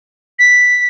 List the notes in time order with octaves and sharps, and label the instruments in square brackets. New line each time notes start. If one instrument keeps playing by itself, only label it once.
[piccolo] B6